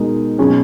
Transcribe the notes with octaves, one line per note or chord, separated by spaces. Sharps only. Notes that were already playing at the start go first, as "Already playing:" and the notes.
Already playing: B2 G#3 D#4 A#4
B2 F#3 C#4 G#4